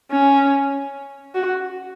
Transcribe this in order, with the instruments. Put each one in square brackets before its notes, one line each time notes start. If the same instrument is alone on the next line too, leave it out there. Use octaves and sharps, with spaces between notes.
[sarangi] C#4
F#4